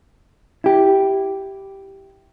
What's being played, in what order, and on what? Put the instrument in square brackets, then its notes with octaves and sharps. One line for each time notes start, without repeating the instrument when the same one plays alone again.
[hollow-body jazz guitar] E4 G4